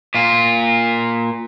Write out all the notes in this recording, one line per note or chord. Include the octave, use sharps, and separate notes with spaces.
A#2 F4